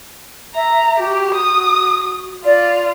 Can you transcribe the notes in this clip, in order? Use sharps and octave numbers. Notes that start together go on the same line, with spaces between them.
E5 A#5
F#4 G4
D#6
F4 D5